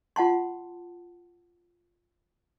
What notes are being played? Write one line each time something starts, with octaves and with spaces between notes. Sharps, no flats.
F4 F#5 A5 C6